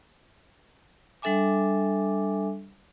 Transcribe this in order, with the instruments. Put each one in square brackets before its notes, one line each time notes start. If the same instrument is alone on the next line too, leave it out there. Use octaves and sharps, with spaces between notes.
[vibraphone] G3 D4 A4 E5 G#5 D6